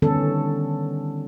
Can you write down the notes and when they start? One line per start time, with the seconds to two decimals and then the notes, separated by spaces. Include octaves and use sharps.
0.02 D3 D#3 G3 B3 C#4 A4